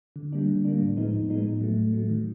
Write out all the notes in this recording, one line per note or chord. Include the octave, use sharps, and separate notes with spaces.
D3
G3 A#3 D4
D3
G3 A#3 D4
A2
F3 G#3 B3 D#4
A2
F3 G#3 B3 D#4
A2
F#3 A3
A2
F#3 A3
D#3